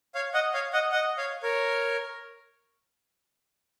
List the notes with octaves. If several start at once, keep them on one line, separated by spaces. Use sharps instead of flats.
C#5 F5
D#5 F#5
C#5 F5
D#5 F#5
D#5 F#5
C#5 F5
A#4 C#5